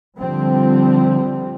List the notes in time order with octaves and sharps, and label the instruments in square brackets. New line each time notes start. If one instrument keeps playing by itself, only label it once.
[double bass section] D3 F3 G3 C4